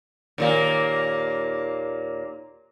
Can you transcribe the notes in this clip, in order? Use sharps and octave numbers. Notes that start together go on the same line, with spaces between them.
D#2 A#2 A#3